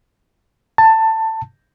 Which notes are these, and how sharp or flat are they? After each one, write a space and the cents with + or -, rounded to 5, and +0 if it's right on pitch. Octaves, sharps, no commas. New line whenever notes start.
A5 +15